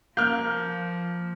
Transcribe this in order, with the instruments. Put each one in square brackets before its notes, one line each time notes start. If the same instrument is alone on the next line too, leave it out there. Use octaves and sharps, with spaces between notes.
[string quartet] F3 [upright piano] A#3 F6 [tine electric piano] G6